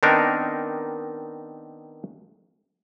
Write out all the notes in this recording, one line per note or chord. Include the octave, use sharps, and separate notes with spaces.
D#3 B3 C4 D4 D#4 A#4